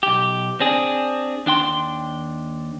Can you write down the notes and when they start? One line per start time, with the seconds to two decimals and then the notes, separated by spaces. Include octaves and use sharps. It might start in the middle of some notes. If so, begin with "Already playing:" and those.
0.03 B1 G4
0.60 C4 D4 G#4
1.46 D#2 D4 G5 C6